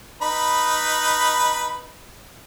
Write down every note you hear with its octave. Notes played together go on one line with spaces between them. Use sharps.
D#4 B4 B5